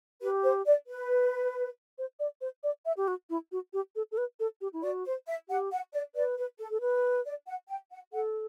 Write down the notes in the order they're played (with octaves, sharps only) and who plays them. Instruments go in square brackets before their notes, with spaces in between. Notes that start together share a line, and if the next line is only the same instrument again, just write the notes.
[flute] G4 [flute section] B4
[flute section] C5
D5
B4
[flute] C5
D5
C5
D5
E5
G4
F#4
E4
F#4
G4
A4
A4
B4
A4
G4
E4
[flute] F#4 [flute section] D5
[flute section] C5
E5
[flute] G4 [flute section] F#5
[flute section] F#5
D5
[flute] B4 [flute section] D5
[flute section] B4
A4
[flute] A4
B4
[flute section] D5
F#5
G5
F#5
[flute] A4 [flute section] F#5